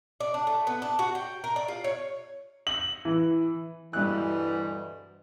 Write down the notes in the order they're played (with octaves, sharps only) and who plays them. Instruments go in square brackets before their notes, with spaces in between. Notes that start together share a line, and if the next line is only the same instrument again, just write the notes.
[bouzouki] D5
D4
A3
B3
D4
F#4
G5
A#4
D5
F4
C#5
[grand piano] F#7
E3
[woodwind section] D2 B2 G3 [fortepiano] G2 F#6 [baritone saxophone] E3